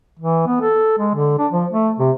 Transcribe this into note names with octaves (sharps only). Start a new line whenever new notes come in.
E3
B3
A4
G#3
D3
D4
F3
A3
C3